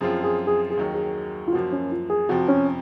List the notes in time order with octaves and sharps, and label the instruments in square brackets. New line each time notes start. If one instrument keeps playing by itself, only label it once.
[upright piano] F#2 F3 C4 F4 [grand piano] G#4
[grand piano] G#4
G#4
G#4
[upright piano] D#2 D#3 F#3
[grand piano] G#4
F4
[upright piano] F#2 F3 A#3 [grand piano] F#4
[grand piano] C#4
F4
G#4
[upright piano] F2 C3 F3 [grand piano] F#4
[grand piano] C#4